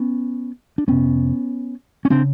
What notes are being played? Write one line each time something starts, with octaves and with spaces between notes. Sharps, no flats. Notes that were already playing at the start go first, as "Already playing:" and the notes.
Already playing: B3 C#4
D4
F2 C3 B3 C#4
C#4
C#3 C4 D4